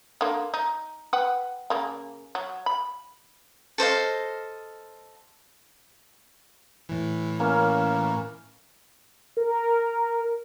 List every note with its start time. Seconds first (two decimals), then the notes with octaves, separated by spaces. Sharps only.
0.21 D3 A#3
0.54 D#4
1.13 B4 F#5 G5
1.70 C#3 A#3
2.35 F#3
2.66 B5
3.78 A4 C5 D#5 F5
6.89 A2 E3
7.40 A#3 C#4
9.37 A#4